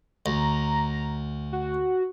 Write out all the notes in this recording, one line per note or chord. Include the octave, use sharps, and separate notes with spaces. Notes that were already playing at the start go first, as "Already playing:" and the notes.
D2 A#5
F#4